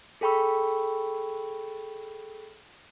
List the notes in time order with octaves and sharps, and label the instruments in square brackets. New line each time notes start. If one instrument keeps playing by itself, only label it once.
[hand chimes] G#4 A4 G5 B5 C#6 E6